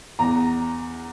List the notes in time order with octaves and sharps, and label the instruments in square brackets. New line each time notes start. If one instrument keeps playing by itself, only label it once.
[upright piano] E2 A#5